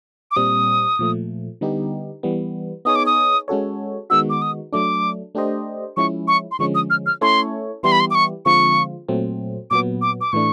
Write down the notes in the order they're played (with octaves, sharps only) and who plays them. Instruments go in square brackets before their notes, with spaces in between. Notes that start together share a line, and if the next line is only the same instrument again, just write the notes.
[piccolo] D6
[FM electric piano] A#2 G3 C4 [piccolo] D#6
[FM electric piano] A#2 F3 A3
D3 G3 B3 D#4 G4
E3 G3 B3
[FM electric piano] B3 D#4 G#4 C#5 [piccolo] D#6
[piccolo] D6
D#6
[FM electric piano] G#3 C#4 F#4 A4 C#5
[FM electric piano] D#3 G#3 B3 D#4 F#4 [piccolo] E6
[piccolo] D6
D#6
[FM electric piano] F#3 A3 D4 [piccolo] D6
[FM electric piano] A3 D4 G4 C5 D#5
[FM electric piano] F3 G#3 C#4 E4 [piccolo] C#6
[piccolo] C#6
C6
[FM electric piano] D3 F3 G#3 C#4 [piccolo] C#6
[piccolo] D#6
F6
F6
[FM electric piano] A3 C#4 E4 A4 C#5 [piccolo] C6
[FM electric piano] E3 G3 B3 E4 G4 [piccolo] C6
[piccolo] B5
C6
D6
C#6
[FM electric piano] D3 F3 G#3 C4 F4 [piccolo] C#6
[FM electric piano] A#2 F#3 A3 C4
[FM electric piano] A#2 F#3 B3 [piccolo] D6
[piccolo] D6
D6
[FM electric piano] A2 E3 A3 D4 [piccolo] C#6